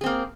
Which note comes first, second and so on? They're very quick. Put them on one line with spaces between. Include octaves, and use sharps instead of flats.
G#4 C4 A#3